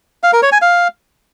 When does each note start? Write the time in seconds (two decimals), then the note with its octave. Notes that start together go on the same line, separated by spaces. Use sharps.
0.23 F5
0.33 A#4
0.43 C#5
0.52 G#5
0.62 F5